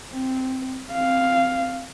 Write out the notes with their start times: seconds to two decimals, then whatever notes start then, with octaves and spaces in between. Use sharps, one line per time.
0.12 C4
0.93 C4 F5